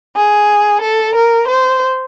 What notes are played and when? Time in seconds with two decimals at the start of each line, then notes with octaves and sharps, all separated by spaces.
0.16 G#4
0.82 A4
1.15 A#4
1.48 C5